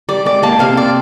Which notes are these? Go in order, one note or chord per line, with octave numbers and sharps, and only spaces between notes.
G3 D5
G#3 D5
A#3 A5
C3 C4 F5
D5